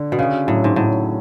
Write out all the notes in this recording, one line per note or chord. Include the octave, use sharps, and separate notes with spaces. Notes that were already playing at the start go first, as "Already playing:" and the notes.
Already playing: D3
B2
C#3 C#4
A2 F#3
G#2
A2 F#3